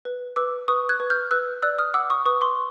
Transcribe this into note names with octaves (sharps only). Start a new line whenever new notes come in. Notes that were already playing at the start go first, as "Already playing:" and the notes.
B4
B4 D6 E6
B4 C#6 D#6
F#6 G#6
B4
F6 G6
B4 E6 F#6
D5 E6 F#6
D#6 F6
F#5 D6 E6
C#6 D#6
B4 C#6 D#6
C6 D6